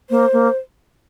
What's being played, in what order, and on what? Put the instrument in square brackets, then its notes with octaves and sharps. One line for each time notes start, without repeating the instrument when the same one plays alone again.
[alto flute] A#3 [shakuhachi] C5
[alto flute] A#3